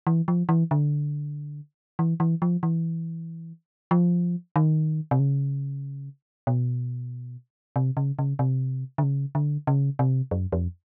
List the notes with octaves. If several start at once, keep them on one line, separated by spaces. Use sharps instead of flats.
E3
F3
E3
D3
E3
E3
F3
E3
F3
D#3
C3
C#3
B2
C3
C#3
C#3
C3
D3
C#3
D3
C#3
C3
F#2
F2